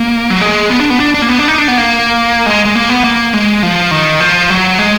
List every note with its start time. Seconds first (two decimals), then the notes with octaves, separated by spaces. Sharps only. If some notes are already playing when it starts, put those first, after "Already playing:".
Already playing: A#3
0.30 F#3
0.41 G#3
0.70 B3
0.80 D4
0.90 B3
1.00 D4
1.14 D4
1.22 A#3
1.29 B3
1.39 D4
1.48 D#4
1.58 D4
1.68 B3
1.78 A#3
2.46 G#3
2.65 G#3
2.75 A#3
2.90 B3
3.04 A#3
3.33 G#3
3.63 F3
3.91 D#3
4.20 F3
4.50 F#3
4.79 G#3